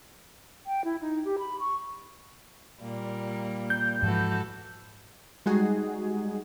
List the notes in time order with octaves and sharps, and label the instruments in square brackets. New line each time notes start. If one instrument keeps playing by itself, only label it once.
[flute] G5
E4
D#4
G4
B5
C#6
[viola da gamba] A#2 G3 A#3
[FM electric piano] G6
[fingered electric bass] G#2 F3 [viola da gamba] E3 F#4 A4
[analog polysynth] G3 G#3 D#4 F#4 G#4